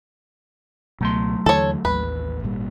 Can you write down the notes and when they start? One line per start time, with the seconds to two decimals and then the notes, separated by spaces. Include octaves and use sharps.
1.01 C#2 B2 F#3 A3 C6
1.46 D#2 D3 E3 A4 C#5
1.85 A1 D#2 B4
2.43 G#1 A#2 G3